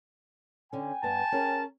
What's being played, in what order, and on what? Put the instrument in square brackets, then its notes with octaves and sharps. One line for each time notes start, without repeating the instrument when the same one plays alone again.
[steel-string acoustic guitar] D3 C#4 [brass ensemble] G5 G#5
[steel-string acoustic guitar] G2 B3 [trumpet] A5
[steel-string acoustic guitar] C#4 G#4 A#4